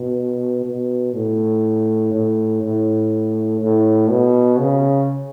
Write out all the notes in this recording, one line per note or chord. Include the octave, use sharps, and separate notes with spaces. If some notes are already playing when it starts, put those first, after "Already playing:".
Already playing: B2
B2
A2
A2
A2
A2
B2
C#3